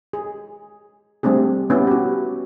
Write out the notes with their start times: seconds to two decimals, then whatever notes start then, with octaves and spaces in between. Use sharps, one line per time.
0.13 G#4
1.23 G3 A3 C4 D4 G#4
1.70 B3 C#4 E4 G4
1.87 F#4 G4